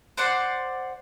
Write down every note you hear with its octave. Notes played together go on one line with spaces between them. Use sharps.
C5 D5 F#5 C6